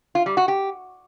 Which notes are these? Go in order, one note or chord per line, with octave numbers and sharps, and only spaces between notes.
F4
G3
F#4
G4